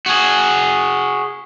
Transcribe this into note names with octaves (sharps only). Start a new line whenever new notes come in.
F#4 G#4